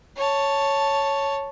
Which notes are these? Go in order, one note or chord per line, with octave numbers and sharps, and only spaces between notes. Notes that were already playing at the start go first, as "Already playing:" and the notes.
C#5 A5